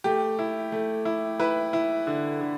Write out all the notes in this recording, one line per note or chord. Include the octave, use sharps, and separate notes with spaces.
A3 G4
E4
A3
E4
E4 B4
E4
D3
D3